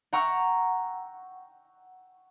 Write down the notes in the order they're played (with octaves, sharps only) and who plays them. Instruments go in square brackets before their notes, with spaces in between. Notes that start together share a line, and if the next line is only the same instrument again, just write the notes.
[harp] F#5 G5 A#5 C#6 E6